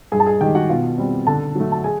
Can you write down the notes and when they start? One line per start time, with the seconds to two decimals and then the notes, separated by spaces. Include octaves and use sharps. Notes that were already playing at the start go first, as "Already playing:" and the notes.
0.12 G2 G#4 G#5
0.20 A5
0.26 G#4 G#5
0.41 D#3 G#3 G4 G5
0.55 F#4 F#5
0.69 B2 F4 F5
0.98 G3 C4
1.27 D3 A4 A5
1.55 F#3 A3
1.72 A5
1.84 G#4 G#5